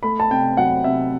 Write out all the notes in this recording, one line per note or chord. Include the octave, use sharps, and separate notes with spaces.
A3 B5
A5
C3 G5
F#3 F#5
C3 E5